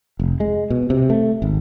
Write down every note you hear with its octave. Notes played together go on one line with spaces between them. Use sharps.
F1
G#3
B2
C3
A3
G#1